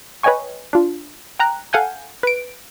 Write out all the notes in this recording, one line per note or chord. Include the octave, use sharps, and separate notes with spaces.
B4 C#5 D#5 G5 G#5 C#6
D4 F4
G5 A#5 F#6
A4 F5 F#5 G#5 G6
B4 D7